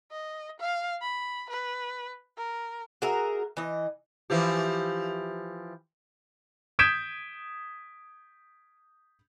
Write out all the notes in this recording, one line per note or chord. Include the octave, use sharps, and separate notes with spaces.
D#5
F5
B5
B4
A#4
F#4 G#4 A#4 E5
E3 D#5
E3 F3 G4
D#6 G6 G#6 B6 D7 E7